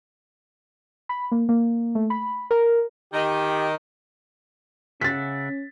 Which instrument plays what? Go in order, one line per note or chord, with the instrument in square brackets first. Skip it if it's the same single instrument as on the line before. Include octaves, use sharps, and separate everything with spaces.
[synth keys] B5
A#3
A#3
A3
B5
A#4
[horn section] D#3 [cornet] G4
[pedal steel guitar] C#3 E5 F#5 [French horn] C#4 [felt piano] A6 B6